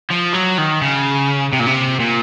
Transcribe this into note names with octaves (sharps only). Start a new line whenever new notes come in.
F3
F#3
D#3
C#3
C3
A#2
C3
A#2